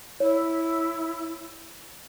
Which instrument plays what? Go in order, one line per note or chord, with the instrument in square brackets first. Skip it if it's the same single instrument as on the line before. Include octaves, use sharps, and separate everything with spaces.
[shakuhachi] E4 [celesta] C#5